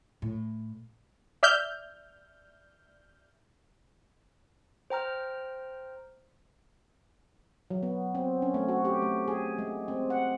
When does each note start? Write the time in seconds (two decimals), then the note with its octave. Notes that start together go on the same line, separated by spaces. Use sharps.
0.22 A2
1.43 D5 E5 F6 G6
4.90 C5 G5 A#5 F6
7.70 F#3
7.83 B3
8.15 C4
8.42 C#4
8.54 A3
8.69 F#4
8.85 G4
9.02 A3
9.28 G#4
9.59 G#3
9.88 C4
10.10 F#5